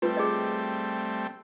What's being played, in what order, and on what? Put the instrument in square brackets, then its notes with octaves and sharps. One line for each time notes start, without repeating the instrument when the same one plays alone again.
[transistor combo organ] G3 A3 C4 [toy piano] F4 B4
[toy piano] G#4 D#5